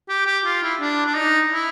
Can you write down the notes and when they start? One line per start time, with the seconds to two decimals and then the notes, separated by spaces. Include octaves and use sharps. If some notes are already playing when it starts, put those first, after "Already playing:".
0.09 G4
0.26 G4
0.45 F4
0.63 E4
0.81 D4
1.06 D4
1.17 D#4
1.52 E4